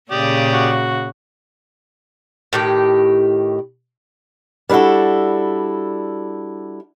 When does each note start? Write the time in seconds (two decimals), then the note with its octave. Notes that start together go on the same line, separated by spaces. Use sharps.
0.11 A#2 C#3 G4 D5 D#6
0.53 F#4
2.53 A2 D#3 G4
4.69 G3 D4 E4 F#4 A4